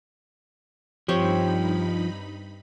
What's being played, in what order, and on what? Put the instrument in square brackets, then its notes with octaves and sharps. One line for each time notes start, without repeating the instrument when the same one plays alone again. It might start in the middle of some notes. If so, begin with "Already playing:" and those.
[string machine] G2 D#4 B5 [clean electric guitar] F3 [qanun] C4 G4 C#5